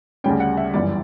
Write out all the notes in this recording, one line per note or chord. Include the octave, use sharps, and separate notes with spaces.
D2 C#3 G3 C#4 G5
F#5
E5
G1 F#2 E3 G3 D5